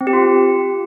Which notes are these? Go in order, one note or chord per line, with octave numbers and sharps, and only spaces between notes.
C4
G4
F4